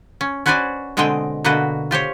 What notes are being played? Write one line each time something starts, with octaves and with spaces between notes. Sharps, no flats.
C#4
C#4 F#4 B4 C5 D5 G#5
B2 D3 G#3 C4 D#5 G5
B2 D3 A#3 F#4 B4 D#5
F4 G4 C5 C#5